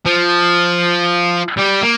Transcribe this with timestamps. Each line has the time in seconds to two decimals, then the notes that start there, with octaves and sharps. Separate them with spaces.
0.06 F3
1.57 G3
1.82 A#3